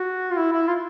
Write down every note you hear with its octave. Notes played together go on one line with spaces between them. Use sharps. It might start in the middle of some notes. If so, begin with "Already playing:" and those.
Already playing: F#4
F4
E4
E4
F4